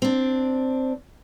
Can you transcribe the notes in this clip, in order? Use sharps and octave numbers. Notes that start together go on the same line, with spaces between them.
C4 D4